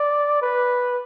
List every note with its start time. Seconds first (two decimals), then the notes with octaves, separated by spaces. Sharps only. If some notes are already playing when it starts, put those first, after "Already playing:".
Already playing: D5
0.42 B4